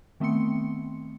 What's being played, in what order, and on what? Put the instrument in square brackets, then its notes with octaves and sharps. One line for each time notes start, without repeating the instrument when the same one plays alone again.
[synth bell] D#3 A3 B3 C4 C6 C#7